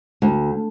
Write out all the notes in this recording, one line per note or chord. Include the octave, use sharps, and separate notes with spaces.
D2